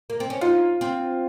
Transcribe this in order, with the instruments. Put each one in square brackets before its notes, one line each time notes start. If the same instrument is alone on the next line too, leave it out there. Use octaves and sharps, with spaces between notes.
[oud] A#3
C4
C#4
[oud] D#4 [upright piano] F4
[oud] C4